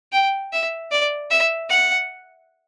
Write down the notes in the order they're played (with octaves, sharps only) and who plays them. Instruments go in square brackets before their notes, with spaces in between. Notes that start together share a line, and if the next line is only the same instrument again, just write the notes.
[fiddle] G5
E5
D5
E5
F#5